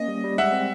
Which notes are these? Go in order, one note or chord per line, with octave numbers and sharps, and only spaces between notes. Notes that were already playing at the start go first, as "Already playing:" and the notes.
Already playing: A#3 C#4 D#5
G3
G3
G#3 E5 F#5
C4